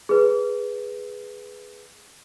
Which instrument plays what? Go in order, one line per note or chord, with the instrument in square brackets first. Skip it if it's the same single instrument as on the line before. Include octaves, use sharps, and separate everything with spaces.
[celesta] G#4 B4